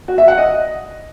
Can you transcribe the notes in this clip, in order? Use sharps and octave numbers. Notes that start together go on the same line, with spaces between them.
F#4
E5
F#5
D#5